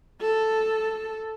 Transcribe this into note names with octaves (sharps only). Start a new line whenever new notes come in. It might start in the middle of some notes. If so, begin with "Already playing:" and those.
A4